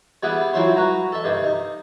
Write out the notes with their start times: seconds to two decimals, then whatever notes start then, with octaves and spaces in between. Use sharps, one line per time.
0.23 G3 B3 E4 G#4 B4
0.53 F3 F#3 C4 E4 C5 C#5
0.76 F#4 B4 A#5
1.12 A4 E5
1.24 G2 C3 D#3
1.44 D#4